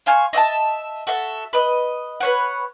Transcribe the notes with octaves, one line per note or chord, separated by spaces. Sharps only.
C5 F5 G#5 C#6
D#5 E5 F#5 A5
F#4 A4 E5
B4 D#5
B4 C#5 F#5